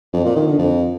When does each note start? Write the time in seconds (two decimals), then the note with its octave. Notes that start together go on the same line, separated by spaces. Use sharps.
0.13 F2
0.25 A#2
0.36 D#3
0.47 D3
0.58 F2